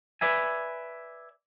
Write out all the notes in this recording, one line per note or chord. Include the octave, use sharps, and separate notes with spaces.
B4 D5 E5 G#5